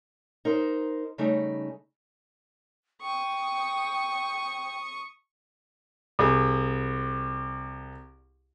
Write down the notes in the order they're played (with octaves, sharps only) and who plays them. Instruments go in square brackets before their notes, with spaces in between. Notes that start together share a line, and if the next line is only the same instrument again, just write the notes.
[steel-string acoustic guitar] D#4 A#4 C5
C#3 G3 A3 D#4
[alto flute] G5 [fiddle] C#6 D#6
[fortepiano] C2 G#4